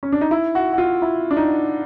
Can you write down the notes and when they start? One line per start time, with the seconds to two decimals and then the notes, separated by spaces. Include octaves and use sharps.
0.03 C#4
0.12 D4
0.21 D#4
0.31 E4
0.55 F#4
0.73 F#4
0.78 F4
1.02 E4
1.31 D4
1.37 D#4